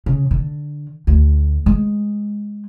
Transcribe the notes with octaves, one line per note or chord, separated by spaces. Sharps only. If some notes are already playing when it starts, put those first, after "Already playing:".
C#3
D3
D2
G#3